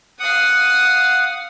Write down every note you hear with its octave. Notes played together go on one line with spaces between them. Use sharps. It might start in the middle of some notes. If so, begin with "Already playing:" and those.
F5 F#5 D#6